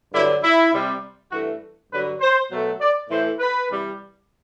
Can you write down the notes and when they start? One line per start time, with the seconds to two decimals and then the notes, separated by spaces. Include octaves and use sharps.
0.13 G2 D3 F#3 E4
0.43 E4
0.72 C3 G3
1.31 G2 E3 A3 F#4
1.91 G2 D3 F#3 B4
2.20 C5
2.50 B2 F#3 A3
2.80 D5
3.09 A2 E3 A3 C5
3.40 B4
3.69 C3 E3 G3